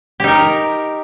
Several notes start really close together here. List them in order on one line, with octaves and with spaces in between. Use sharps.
G4 D#4 A#4